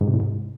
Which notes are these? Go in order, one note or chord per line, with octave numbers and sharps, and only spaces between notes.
G#2
C3
A2
G#2